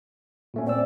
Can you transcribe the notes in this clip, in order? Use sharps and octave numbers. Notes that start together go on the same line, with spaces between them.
A#2 A3 C#4
C4 D5 E6